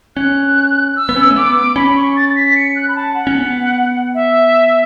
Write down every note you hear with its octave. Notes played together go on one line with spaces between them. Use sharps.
C#4 F#6
E6
B3
C#4
A3
B3 D6
C#4 B5
C#6
A6
A6
B6
C#7
F#6
B5
A5
F#5
C#4
B3
E5